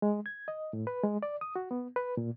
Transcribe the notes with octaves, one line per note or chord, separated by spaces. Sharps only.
G#3
G#6
D#5
A2
B4
G#3
D5
D#6
F#4
B3
B4
A#2